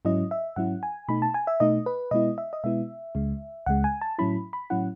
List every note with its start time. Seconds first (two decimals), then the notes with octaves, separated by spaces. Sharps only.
0.05 G#2 F#3 C#4 E4 D#5
0.31 E5
0.56 G#2 F#3 C#4 E4 F#5
0.83 G#5
1.09 B2 A3 D#4 B5
1.22 A5
1.34 G#5
1.47 E5
1.60 B2 A3 D#4 D#5
1.86 B4
2.11 B2 G#3 B3 E4 D#5
2.38 E5
2.53 D#5
2.64 B2 G#3 B3 E4 E5
3.15 C#2 C#3 G#3
3.66 C#2 C#3 G#3 F#5
3.84 G#5
4.01 A5
4.19 A2 F#3 C#4 E4 B5
4.53 B5
4.70 A2 F#3 C#4 E4 F#5